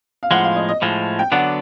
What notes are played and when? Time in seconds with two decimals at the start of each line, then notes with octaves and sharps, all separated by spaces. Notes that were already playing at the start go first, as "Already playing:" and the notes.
0.23 F5
0.31 A2 F3 G#3 F#5
0.44 F5
0.56 D#5
0.69 D#5
0.82 A2 F3 G#3
1.19 G5
1.32 D3 F#3 B3 D4 F#5